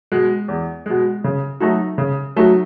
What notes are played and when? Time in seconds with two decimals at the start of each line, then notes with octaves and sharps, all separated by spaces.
0.12 B2 G#3
0.48 E2
0.86 B2 G#3
1.24 C#3
1.60 F#3 A3 D#4 F#4
1.98 C#3
2.36 F#3 A3 D#4 F#4